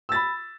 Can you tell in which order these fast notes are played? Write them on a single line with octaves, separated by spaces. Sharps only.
E6 A6 B5